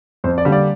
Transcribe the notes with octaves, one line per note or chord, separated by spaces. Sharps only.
F2 C5
D5
D3 G3 A#3 D4
D5